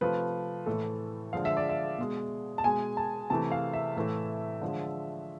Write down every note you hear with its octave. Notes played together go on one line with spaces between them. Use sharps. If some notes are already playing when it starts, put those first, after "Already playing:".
C3 F3 A3 B4
A2 E3 A3 A4
D3 F3 G#3 F5
E5
D5
E5
B2 G#3
A5
B2 G#3 G#5
A5
C3 E3 A3 A5
F5
E5
A2 E3 A3
D3 F3 G#3